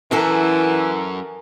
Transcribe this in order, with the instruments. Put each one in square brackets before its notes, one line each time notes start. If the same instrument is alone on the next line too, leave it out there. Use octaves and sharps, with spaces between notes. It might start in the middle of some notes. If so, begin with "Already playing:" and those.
[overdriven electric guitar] F#2 [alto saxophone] E3 [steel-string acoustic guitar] E4 F#4 A4 [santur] A#4 G#5 A5